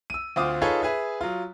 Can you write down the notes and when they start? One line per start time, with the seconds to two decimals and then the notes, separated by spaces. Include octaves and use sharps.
0.10 E6 D#7
0.36 D2 C4 F4 D6 D#6
0.62 D#4 F4 G#4 A4 B4 C#5
0.82 G#4 B4 E5
1.21 F#3 F4